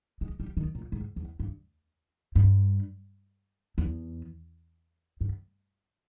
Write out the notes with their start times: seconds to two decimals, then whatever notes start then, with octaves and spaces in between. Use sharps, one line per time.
0.21 G#3
0.40 G3
0.57 D#3
0.75 A#2
0.92 G#2
1.16 E2
1.40 G2
2.35 G2
3.78 E2
5.21 G2